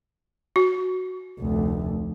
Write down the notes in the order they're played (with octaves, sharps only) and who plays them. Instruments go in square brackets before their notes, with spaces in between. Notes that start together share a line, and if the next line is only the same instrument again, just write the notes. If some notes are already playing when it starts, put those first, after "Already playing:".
[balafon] F#4
[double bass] F1 D2